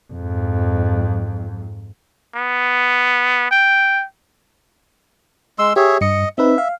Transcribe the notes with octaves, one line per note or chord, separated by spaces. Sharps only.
F2 G#2
B3
G5
G#3 C6 E6
G4 G#4 C#5 E5
G2 D#5 C#7
C4 D#4 B4 E5
F5